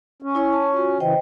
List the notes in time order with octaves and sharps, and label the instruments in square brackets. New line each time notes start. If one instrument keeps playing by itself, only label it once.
[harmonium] C#4
[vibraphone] E4 C#5 C#6
A5
F4 F#4
[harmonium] C#3 E3 [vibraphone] C5 D#5 G5